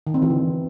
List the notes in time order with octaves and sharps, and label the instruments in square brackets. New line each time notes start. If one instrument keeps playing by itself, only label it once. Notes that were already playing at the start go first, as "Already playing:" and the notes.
[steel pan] D#3
C4
E3
D3